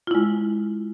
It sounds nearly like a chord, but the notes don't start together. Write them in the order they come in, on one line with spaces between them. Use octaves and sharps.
F4 E4 G#3